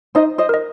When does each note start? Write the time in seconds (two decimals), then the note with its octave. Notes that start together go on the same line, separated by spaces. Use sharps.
0.15 D#4 C5 D#5
0.38 C5 D#5
0.49 A#4 D#5